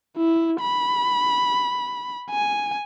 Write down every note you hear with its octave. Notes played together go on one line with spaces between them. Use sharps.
E4
B5
G#5